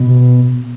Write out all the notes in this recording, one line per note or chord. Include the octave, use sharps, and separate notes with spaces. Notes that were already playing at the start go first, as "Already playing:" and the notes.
Already playing: B2